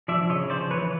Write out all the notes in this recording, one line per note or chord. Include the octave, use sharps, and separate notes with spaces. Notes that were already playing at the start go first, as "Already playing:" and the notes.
F3 D5 E5
C#3 C#5 D#5
F3 C5 D5
E3 B4 C#5